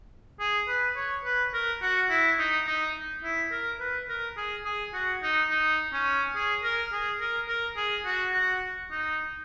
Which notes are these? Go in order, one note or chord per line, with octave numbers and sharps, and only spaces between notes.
G#4
B4
C#5
B4
A#4
F#4
E4
D#4
D#4
E4
A#4
B4
A#4
G#4
G#4
F#4
D#4
D#4
C#4
G#4
A#4
G#4
A#4
A#4
G#4
F#4
F#4
D#4